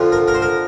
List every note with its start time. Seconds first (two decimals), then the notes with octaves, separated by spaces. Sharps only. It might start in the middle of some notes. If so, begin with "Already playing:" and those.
Already playing: F2 D3 F3
0.12 A#4
0.28 A#4
0.34 C5
0.42 A#4